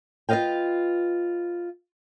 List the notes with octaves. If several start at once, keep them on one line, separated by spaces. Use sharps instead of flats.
F4 B4 C5 D#5 F5 G5